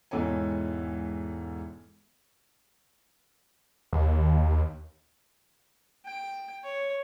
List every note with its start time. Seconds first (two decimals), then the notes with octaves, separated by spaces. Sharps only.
0.11 E1 G#2 E3 A4 C#5 G#5
3.93 D#2
6.05 G5
6.63 C#5